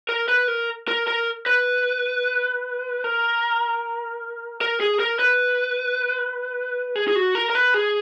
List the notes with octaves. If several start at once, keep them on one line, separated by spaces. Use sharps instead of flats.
A#4
B4
A#4
A#4
A#4
B4
A#4
A#4
G#4
A#4
B4
G#4
G#4
F#4
A#4
A#4
B4
G#4